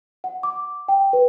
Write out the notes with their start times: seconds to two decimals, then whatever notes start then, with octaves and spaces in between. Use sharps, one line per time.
0.24 F#5
0.43 D6
0.88 G5
1.13 B4